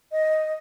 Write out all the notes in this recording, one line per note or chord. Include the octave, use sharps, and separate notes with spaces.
D#5